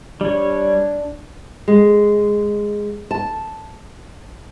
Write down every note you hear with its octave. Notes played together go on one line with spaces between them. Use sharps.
G3 D4 C#5
G#3
A5